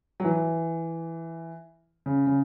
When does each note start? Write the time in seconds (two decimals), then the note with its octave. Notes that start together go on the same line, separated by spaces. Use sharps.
0.20 F#3
0.24 E3
2.06 C#3
2.27 C#3